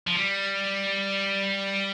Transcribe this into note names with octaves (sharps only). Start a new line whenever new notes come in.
F3
G3